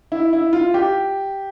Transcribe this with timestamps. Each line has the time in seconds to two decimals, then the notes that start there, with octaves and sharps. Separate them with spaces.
0.12 E4
0.33 E4
0.53 F4
0.74 G4